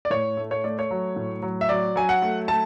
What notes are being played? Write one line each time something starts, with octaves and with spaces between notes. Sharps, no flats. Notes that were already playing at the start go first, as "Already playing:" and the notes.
D5
A2 C#5
A3
C#5
A3 D5
C#5
F#3
A2
F#3
E5
F#3 D5
F#3 G#5
F#5
A3
A3 A5